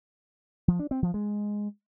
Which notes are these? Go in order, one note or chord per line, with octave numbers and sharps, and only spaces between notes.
F3
D4
C4
F3
G#3